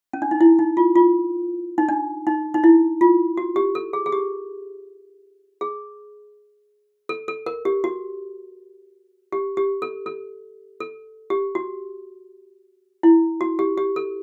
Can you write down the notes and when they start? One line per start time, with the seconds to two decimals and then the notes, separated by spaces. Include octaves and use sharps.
0.13 C#4
0.22 D4
0.31 D#4
0.41 E4
0.59 D#4
0.77 F4
0.96 F4
1.78 D#4
1.89 D4
2.27 D#4
2.54 D#4
2.64 E4
3.01 F4
3.37 F#4
3.56 G4
3.75 A4
3.93 G#4
4.06 G#4
4.12 G4
5.61 G#4
7.09 A4
7.28 A4
7.46 A#4
7.65 G4
7.84 F#4
9.32 G4
9.57 G4
9.82 A4
10.06 A4
10.80 A4
11.30 G4
11.55 F#4
13.03 E4
13.41 F#4
13.59 G4
13.78 G4
13.96 A4